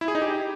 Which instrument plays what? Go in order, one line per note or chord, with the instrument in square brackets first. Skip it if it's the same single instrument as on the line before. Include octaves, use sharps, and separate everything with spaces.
[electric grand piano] E4
G#4
D#4
G4